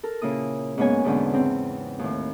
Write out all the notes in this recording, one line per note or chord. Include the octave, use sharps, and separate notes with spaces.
A4 A#4
A#2 C#3 A#3 E4 D#6
G#2 A#3 B3 C#4 C#5 G#5
E2 G#2 B2 D3 C#4
C#3 C4
D#2 A2